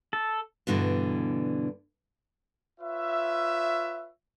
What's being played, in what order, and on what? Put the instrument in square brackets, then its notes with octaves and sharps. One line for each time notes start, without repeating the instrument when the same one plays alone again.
[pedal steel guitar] A4
[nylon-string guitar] G2 B2 D3 E3
[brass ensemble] F4 B4 C#5 E5